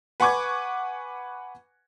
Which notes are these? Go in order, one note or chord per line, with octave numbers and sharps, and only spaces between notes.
B4 F#5 G#5 C#6 D6 G#6